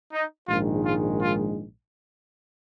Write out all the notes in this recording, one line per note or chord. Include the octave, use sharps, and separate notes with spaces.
D#4
A#1 G#2 D#3 G#3 F4
F4
F4